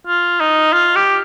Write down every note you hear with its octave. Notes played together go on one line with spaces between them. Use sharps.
F4
D#4
F4
G4